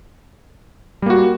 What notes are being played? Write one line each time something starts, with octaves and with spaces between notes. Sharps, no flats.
G3 A#3 F#4